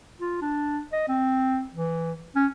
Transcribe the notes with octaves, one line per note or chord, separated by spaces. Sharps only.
F4
D4
D#5
C4
E3
C#4